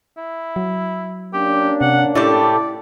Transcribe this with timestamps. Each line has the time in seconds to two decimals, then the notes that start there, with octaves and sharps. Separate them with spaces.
0.17 E4
0.56 F#3
1.33 A#3 C#4 D4 G4
1.81 C3 F#5
2.15 A2 A3 E4 G4 D5